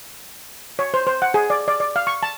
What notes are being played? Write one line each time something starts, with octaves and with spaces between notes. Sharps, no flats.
C#5
C5
C5
F#5
G#4
D5
D5
D5
F5
C#6
A5